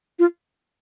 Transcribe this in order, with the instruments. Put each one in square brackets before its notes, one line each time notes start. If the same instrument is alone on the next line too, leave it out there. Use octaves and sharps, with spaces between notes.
[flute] F4